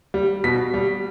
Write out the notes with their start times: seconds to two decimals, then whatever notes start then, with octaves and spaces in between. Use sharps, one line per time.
0.14 G3
0.44 B2 B6
0.74 G3